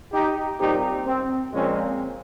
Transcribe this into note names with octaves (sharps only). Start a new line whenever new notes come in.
D#4 G4
A#2 G3 C4 D#4 G4
C4
A#2 F3 G#3 C4 C#4